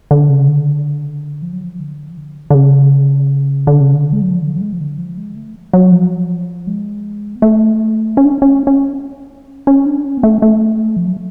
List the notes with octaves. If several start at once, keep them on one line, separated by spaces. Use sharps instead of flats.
D3
C#3
D3
F3
F#3
F3
D3
F3
D3
D3
C#3
D3
C#3
D3
G#3
F#3
F3
D3
F#3
G#3
F3
D3
F3
G#3
A3
F#3
F3
G#3
B3
A3
C#4
D4
C#4
C#4
C#4
C#4
D4
C#4
B3
A3
A3
F3
F#3